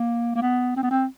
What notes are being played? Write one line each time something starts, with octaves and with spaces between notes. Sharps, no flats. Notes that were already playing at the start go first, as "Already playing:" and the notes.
Already playing: A#3
A#3
B3
C4
B3
C4